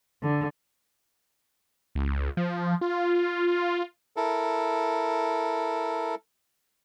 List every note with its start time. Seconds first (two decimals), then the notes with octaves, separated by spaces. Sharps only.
0.22 D3
1.95 C#2
2.37 F3
2.81 F4
4.17 E4 A4 A#4